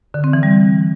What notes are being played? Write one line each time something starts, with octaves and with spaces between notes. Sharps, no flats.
D3
C4
E3
G3